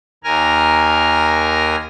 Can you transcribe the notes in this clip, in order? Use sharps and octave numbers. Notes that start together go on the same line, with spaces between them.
D#2 A#4 G#5 F6